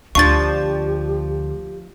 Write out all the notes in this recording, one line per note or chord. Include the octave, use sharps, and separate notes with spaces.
D2 F3 D4 F4 G4 C#6 A6